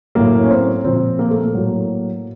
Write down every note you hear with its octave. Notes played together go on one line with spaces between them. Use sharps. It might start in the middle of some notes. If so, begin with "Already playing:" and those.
A2 F#3 A#3
C#4
C4
A#2 F3 C4
A#3
A3
A#3
A2 F#3